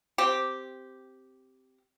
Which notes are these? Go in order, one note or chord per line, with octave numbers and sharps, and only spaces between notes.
C4 G4